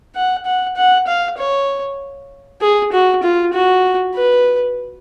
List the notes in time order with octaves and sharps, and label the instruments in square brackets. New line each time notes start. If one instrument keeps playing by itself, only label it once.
[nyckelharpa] F#5
F#5
F#5
F5
C#5
G#4
F#4
F4
F#4
B4